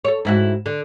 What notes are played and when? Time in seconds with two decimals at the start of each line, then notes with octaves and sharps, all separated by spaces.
0.05 A4 C#5
0.25 G#2 E4 F#4
0.66 D3